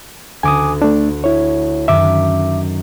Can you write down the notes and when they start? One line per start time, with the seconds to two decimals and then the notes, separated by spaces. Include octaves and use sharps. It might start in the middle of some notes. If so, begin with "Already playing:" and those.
0.43 D2 G#5 D6 D#6
0.82 A3 D4
1.24 E4 C#5
1.88 F#2 D#3 E5 D6